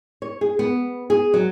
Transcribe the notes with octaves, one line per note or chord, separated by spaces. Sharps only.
C#5
G#4
B3
G#4
F#3